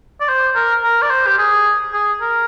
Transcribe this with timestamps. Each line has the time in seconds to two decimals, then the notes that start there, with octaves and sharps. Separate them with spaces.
0.20 D5
0.29 C5
0.55 A#4
0.83 A#4
1.02 D5
1.10 C5
1.27 G4
1.38 G#4
1.93 G#4
2.21 A#4